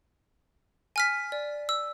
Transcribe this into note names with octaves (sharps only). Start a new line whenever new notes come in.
G#5 F6 B6
D5
E6